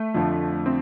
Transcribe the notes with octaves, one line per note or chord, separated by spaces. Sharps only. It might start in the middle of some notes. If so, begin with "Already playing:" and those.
Already playing: A3
F2 D3 F3
C4